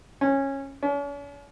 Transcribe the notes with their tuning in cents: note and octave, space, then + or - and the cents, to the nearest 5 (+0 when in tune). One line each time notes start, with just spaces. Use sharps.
C#4 -15
C#4 +45